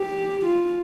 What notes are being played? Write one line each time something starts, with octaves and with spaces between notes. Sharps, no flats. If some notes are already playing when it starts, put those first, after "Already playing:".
Already playing: G4
F4